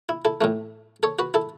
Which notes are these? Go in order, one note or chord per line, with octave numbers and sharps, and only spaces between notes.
E4
E4 A4
A2 E3 A3
A4 C#5
F#4 B4
E4 A4